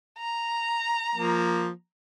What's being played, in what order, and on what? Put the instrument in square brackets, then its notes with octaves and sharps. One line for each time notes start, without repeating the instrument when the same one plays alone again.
[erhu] A#5
[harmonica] F3 A#3